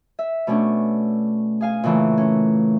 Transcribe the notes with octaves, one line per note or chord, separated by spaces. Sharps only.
E5
B2 A3 C#4 D4
G#4 F5 G#5
A#2 C#3 E3 A3
C#4